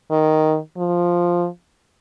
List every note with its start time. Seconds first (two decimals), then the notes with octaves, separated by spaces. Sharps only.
0.11 D#3
0.78 F3